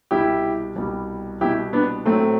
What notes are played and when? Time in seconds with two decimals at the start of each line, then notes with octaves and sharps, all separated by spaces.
0.11 C2 B2 G3 E4 G4
0.76 C2 B2 G3
1.41 C2 B2 G3 E4 G4
1.73 B3 D4
2.06 A2 F#3 A3 C4